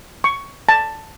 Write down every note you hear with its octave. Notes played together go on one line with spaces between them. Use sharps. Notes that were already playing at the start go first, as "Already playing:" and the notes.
C#6
A5